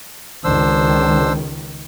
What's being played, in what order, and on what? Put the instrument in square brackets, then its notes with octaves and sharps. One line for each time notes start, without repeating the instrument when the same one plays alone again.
[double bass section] C#2 D#3 [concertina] D4 C5 E6